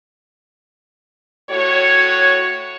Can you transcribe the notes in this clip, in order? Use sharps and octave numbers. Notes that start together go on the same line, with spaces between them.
A2 F#4 C#5